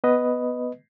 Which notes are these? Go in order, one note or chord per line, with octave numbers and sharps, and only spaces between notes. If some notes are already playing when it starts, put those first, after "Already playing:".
B3 B4 D#5